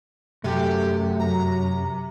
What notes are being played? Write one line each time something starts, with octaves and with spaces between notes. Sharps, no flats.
F#2 C3 A3 G4
F#3 A#5